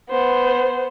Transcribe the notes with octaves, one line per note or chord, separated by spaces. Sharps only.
B3 C5